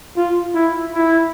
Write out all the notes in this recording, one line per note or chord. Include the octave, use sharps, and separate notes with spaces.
F4
E4
E4